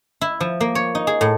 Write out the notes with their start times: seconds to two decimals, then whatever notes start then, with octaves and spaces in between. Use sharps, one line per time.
0.21 E4
0.40 F3
0.60 A#3
0.75 C#5
0.95 D#4
1.07 G#4
1.21 A2